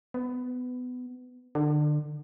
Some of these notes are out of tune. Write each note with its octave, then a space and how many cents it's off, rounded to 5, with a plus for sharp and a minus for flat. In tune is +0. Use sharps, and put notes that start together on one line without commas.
B3 +20
D3 +30